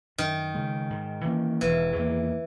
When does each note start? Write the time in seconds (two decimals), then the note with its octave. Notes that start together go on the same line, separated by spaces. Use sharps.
0.18 F#2 D#3
0.54 C#3 G#3
0.90 G#2
1.25 E3 A#3 C#4
1.61 E1 E3
1.96 E2 D#3 A#3